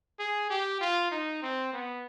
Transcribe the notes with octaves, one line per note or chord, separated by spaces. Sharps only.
G#4
G4
F4
D#4
C4
B3